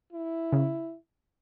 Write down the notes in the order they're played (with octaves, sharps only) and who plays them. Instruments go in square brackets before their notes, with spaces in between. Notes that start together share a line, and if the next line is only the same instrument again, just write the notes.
[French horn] E4
[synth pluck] C#3